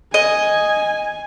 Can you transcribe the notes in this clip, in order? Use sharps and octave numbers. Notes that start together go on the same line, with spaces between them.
D#5 G#5